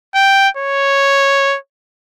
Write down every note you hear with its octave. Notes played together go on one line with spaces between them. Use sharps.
G5
C#5